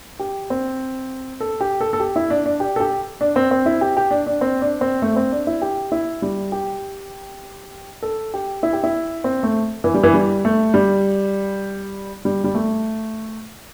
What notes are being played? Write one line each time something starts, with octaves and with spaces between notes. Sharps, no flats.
G4
C4
A4
G4
A4
A4
G4
E4
D4
D4
G4
A4
G4
D4
C4
C4
E4
G4
G4
D4
D4
C4
D4
C4
A3
C4
D4
E4
G4
E4
G3
G4
A4
G4
E4
G4
E4
C4
A3
E3
G3
E3
G3
A3
G3
G3
G3
A3